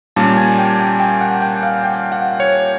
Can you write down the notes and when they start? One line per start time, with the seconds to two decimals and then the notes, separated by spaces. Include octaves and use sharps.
0.16 A#2 G3 A#3 C#4 A5
0.37 G#5
0.58 G5
0.79 G5
1.00 G5
1.21 F#5
1.42 G5
1.63 F5
1.84 G5
2.12 F#5
2.40 C#5